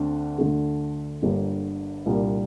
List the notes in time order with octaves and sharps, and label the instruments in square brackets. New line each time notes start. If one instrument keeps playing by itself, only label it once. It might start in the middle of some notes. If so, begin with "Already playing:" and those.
Already playing: [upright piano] D2 D3 A3 C4
D2 D3 A3
G1 G2 D3 G3 A#3
C2 A#2 G3 A#3 D4